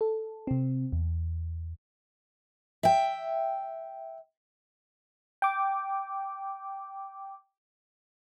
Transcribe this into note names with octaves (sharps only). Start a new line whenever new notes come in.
A4
C3 C4
E2
E5 G5
G5 D6